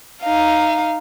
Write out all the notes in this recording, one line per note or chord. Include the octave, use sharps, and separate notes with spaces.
D#4 F5